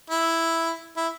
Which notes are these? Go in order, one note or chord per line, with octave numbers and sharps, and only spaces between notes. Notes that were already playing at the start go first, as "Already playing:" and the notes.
E4
E4